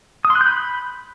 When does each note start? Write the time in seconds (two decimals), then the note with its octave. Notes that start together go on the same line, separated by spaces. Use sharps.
0.25 D#6
0.30 C6
0.35 F#6
0.41 G6
0.46 B5